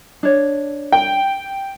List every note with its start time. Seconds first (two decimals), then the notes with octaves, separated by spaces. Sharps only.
0.23 D4 C#5
0.92 G5